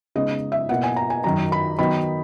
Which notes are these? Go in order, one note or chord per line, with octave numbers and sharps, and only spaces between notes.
C#3 G#3 B3 D#4 D#5
E5
B2 A#3 E4 F#5
G#5
A#5
G#5
F#2 D#3 F#3 A#5
B5
D#3 F#3 B3 D#4 B5